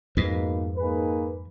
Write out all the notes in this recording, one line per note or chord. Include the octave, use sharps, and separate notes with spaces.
F2 G#2 B2 A#3 D#4 G#4 B4
A#3 D#4 G#4 B4